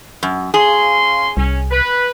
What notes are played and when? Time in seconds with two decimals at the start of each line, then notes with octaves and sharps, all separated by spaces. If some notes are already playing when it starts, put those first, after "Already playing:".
0.23 F#2
0.54 C#3 G#4 F5 C6
1.37 C2 C#4
1.71 B4